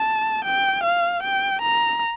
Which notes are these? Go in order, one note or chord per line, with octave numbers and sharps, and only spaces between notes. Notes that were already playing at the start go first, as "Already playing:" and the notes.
Already playing: A5
G5
F5
G5
A#5